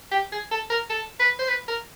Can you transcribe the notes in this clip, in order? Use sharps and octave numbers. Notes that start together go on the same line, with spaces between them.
G4
G#4
A4
A#4
A4
B4
C5
B4
A#4